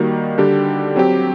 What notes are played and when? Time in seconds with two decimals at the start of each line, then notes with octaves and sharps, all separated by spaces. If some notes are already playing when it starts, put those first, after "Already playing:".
Already playing: D#3 G3 A#3 D#4 F#4
0.38 D3 G3 D4 G4
0.96 F#3 C4 G4